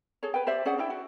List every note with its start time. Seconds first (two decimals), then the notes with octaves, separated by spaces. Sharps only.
0.23 G#4 A4 C#5
0.34 B4 G5
0.46 G4 C5 D5 E5
0.65 C#4 G#4 D5 F#5
0.78 D4 E4 G5
0.90 F#4